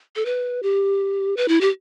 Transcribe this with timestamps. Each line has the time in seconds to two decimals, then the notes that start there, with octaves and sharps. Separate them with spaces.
0.16 A4
0.25 B4
0.63 G4
1.37 B4
1.48 E4
1.61 G4